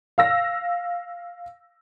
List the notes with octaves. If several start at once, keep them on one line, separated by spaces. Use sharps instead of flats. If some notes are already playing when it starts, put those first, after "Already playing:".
F5 E6 A#6